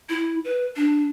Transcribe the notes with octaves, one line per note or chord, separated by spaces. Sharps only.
E4
B4
D4